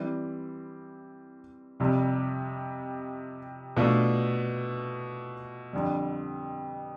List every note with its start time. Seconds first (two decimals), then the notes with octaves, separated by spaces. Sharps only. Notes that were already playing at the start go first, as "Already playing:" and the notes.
Already playing: E3 G3 C4 E4
1.80 F2 C3 G3
3.77 B2 A3 D4 F4
5.73 F2 D3 G3